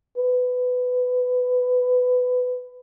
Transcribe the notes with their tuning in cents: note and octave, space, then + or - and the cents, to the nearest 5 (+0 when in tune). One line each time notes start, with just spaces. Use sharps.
B4 +15